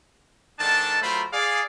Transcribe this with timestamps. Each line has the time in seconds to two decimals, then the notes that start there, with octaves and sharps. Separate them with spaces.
0.60 G#2 D#3 D4 A4 A5
1.02 F#3 A3 F4 A#4 C5 B5
1.33 G#4 D5 F5